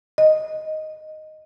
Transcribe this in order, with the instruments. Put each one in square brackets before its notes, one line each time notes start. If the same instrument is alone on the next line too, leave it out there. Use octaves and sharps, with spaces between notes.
[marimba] D#5